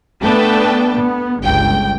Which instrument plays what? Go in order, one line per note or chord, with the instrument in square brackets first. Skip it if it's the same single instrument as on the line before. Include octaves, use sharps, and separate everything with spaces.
[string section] A3 B3 D4 B4 G5 A5
B3
G1 C#2 G5